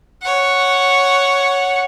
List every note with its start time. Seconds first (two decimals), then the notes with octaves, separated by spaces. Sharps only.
0.22 C#5 F#5